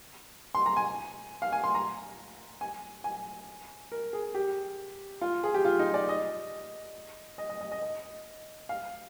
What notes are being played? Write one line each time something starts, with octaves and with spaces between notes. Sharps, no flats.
C6
A#5
G#5
F5
G#5
C6
A#5
G#5
G#5
A#4
G#4
G4
F4
G#4
G4
F4
D#4
D5
D#5
D#5
D#5
D#5
D#5
D#5
F5